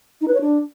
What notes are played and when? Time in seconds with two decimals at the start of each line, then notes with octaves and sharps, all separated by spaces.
0.21 D#4
0.28 B4
0.34 C#5
0.41 D4